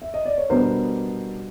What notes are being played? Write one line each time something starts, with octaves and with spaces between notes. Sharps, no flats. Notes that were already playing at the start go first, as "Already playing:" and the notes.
E5
D#5
D5
C#5
B2 G3 B3 D4 A#4 C5